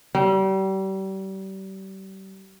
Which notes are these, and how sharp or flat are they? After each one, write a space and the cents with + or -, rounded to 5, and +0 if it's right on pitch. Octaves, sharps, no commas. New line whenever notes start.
G3 -35